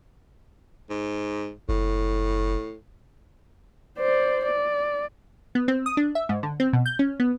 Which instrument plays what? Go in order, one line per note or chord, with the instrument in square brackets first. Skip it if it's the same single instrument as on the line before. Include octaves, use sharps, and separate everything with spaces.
[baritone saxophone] G#2
[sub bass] F#1 [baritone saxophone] A2
[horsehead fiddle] C5 D5
D5
[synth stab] B3
C4
D#6
D4
E5
G#2
D3
C4
B2
G6
C#4
B3